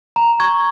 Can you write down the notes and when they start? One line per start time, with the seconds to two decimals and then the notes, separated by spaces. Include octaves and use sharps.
0.16 A#5
0.40 C#6 G#6